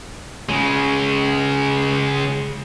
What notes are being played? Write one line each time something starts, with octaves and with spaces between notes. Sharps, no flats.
C#3 G#3